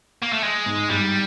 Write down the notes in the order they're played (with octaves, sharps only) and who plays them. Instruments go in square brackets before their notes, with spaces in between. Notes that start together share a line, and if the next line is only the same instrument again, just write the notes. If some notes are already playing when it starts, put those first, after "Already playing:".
[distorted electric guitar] A#3
A3
G#3
[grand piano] G#2
[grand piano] G2 [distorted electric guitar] G3